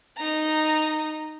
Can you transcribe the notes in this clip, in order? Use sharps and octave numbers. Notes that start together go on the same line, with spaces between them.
D#4 A#5